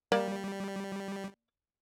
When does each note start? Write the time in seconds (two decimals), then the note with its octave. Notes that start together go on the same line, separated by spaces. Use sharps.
0.12 G3 A#3 D5